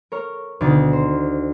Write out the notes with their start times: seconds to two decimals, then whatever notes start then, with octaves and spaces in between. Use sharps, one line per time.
0.12 A#4 C#5 F6
0.61 D2 B2 D#3 D5 D#5 A6
0.93 C5